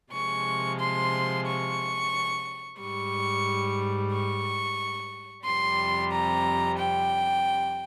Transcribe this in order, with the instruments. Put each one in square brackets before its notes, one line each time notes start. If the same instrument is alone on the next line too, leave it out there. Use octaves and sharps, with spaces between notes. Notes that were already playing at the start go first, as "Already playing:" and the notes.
[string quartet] C3 F3 G#3 C#6
C6
C#6
G#2 G3 C#6
C#6
F2 C3 G3 C6
A#5
G5